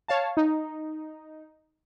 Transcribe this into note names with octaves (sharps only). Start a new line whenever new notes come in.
C#5 F5 A5
D#4